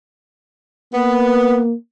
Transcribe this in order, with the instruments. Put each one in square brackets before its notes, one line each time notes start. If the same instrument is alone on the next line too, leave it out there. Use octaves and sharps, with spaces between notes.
[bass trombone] A#3 [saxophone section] B3